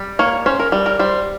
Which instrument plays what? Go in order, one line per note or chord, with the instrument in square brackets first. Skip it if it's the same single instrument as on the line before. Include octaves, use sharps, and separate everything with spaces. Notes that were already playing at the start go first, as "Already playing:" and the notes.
Already playing: [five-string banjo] G3
A#3 C#5
C#4 C5
A#4
G3
A#4
G3 C5